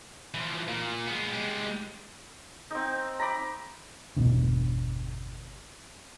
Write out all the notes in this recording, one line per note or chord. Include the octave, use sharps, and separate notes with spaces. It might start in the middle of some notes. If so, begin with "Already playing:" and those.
E3 F3
A#2
G#3 B3
G#3 G4
C4 D#4
A#5 B5 D6
G1 E2 B2 D3